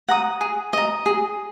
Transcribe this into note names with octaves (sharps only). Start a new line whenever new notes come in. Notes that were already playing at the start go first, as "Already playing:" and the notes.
F#5 A#5 D#6
G#4
D#5 A#5
G#4